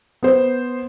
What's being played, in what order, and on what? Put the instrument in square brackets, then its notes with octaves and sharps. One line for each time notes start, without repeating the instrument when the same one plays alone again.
[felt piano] B3 C5